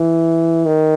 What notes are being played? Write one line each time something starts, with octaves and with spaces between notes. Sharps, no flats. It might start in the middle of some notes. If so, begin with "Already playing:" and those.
Already playing: E3
D#3